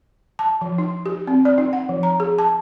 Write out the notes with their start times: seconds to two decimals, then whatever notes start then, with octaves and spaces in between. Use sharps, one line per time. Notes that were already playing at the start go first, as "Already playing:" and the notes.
0.39 A5
0.61 F3
0.78 D#4
1.06 G4
1.27 C4
1.45 D5
1.58 D#4
1.73 F#5
1.89 F3
2.03 A#5
2.20 G#4
2.38 A5